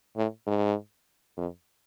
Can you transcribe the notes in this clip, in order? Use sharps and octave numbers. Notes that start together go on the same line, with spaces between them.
A2
G#2
F2